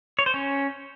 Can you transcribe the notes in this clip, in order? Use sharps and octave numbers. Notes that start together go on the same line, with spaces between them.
C#5
C5
C#4